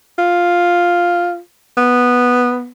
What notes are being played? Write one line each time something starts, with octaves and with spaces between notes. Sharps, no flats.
F4
B3